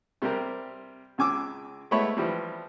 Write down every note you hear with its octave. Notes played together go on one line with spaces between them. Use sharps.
C3 G3 C4 G4 A#4
C#2 C#3 G#5 D6 E6
G#3 A3 B3 E4 C#5 B5
E3 F3 G3